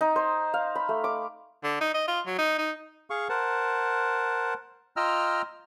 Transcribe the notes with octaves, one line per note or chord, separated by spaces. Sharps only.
D#4
C5
F5
B5
A3
D6
D3
D#4
D#5
F4
F#3
D#4
D#4
G#4 F5 C#6
A#4 C5 F#5 A5
F4 D#5 G5 A#5 E6 F6